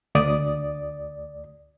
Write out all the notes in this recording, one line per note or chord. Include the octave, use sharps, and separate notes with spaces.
D2 D5 D#6